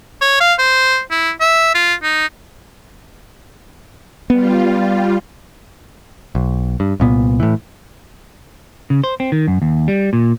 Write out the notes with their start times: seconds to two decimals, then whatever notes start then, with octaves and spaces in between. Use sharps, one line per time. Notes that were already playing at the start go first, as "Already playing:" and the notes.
0.21 C#5
0.40 F5
0.58 C5
1.11 E4
1.40 E5
1.74 F4
2.03 D#4
4.30 G3 B3 F4
6.35 B1
6.80 G2
7.00 C2 A#2 B3
7.40 A2 E3
8.90 C#3
9.04 C5
9.20 C4
9.32 D#3
9.48 F#2
9.62 D#2
9.88 G3
10.13 A#2